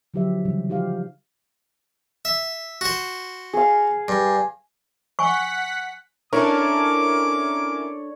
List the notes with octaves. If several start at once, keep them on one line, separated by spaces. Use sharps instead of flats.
D3 F3 F#3 G4 C5 E5
C#3 E3 G3
F3 D#4 F#4 G4 C5 F5
E5
F#4 C5
G#4 F5
G2
F#5 G#5 C#6 B6
C#4 D4 E4 A4 A#4 C#5 D6